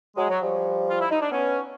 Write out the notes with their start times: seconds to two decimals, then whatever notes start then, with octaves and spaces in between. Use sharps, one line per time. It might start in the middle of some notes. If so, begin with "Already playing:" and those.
0.16 F#3 G#3
0.30 F#3
0.42 F3 G3
0.89 F4
1.00 E4
1.11 D#4
1.21 D4
1.31 B3 C#4